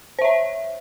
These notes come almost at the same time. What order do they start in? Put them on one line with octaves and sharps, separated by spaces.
C5 E5 C#5